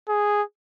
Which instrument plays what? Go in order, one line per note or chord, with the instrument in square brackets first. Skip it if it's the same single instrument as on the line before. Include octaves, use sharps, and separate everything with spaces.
[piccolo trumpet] G#4